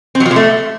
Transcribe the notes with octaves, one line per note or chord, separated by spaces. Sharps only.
C4
F#3
F3
C3
A3